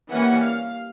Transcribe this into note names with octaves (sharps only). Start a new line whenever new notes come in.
E3 G3 A#3 C#4 F#5
F5